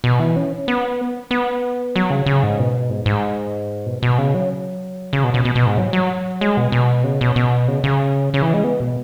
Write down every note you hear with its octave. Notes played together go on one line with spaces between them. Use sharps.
B2
E3
C#4
B3
B3
F#3
C#3
C#3
G#2
B2
G#2
G#2
B2
B2
C#3
F#3
C#3
B2
B2
B2
B2
G#2
F#3
F#3
G#3
B2
B2
C#3
B2
B2
C#3
C#3
C#3
E3
G#3
B3
B2